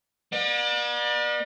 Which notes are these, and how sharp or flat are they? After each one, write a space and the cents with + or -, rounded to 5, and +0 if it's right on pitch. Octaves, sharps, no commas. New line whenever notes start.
B3 -45 D5 +30